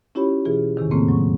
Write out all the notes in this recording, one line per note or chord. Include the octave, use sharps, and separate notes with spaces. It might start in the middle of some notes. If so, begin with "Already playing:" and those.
C#4 E4 F4 G4 C#5 B5
B2 E3 F4 G#4
E2 A2 C3 D#3
F2 A2 C#3 A3 A#3 C4
F#3 C#6